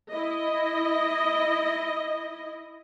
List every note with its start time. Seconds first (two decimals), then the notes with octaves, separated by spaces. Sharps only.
0.11 E4 D#5